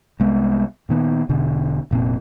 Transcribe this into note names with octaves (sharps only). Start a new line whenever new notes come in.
C2 G#3 B3
A#2 D#3 B3
E1 B2 D3
F1 A#2 C4